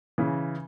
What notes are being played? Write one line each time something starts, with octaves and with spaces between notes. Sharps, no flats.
C#3 E3